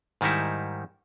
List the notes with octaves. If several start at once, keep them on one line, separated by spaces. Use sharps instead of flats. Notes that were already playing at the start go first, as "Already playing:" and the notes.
G#2 D#3 G3 D#4 E4